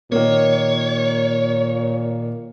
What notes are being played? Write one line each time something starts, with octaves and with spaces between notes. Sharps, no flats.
A#2 D#3 A#3 C#5